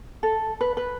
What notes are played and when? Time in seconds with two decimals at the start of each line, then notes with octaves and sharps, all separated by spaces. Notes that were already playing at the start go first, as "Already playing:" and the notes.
0.23 A4
0.61 B4
0.77 B4